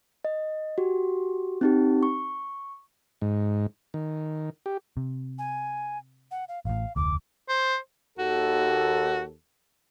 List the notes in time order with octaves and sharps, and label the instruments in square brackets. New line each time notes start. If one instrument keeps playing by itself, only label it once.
[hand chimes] D#5
F#4 G4
C4 D#4 G4
C#6
[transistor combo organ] G#2
D#3
G4
[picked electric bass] C3
[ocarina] G#5
F#5
F5
[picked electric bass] A1 A2 [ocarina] F5
[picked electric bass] F1 D2 [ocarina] D6
[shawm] C5
[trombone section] D#2 A4 [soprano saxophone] F#4